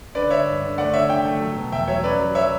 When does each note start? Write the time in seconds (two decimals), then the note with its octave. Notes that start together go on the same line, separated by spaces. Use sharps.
0.15 D3 B4 D5
0.30 D3 C#5 E5
0.46 G2
0.62 D3
0.78 A3 D5 F#5
0.93 D3 C#5 E5
1.09 D3 E5 G5
1.25 A3
1.41 F#3
1.56 B2
1.72 E2 E5 G5
1.88 F#3 C#5 E5
2.04 C#4 B4 D5
2.20 F#3
2.35 F#3 C#5 E5